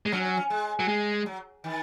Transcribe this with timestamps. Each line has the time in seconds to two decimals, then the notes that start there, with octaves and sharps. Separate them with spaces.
0.06 G#3
0.12 F#3 C#4
0.25 C#4
0.37 C#4
0.50 G#3
0.80 F#3
0.88 G#3
1.26 F#3
1.64 D#3